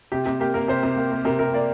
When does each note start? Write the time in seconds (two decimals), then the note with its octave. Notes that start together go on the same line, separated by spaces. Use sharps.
0.12 C3 G4
0.26 C3 G4
0.40 A#3 G4
0.54 A#3 A#4
0.68 C3 C5
0.83 C3
0.97 A#3
1.11 A#3
1.25 C3 A#4
1.39 C3 A#4
1.53 A#3 D5